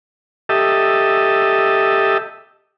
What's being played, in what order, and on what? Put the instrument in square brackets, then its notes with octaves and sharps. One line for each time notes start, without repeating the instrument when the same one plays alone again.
[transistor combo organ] G4 A4 D#5 E5